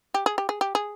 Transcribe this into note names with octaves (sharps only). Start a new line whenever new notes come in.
G4
G#4
G4
G#4
G4
G#4